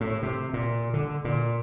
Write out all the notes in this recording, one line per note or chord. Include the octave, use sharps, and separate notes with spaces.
A2
C3
A#2
D3
A#2